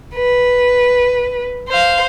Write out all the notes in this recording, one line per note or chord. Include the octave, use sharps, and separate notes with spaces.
B4
C5 F5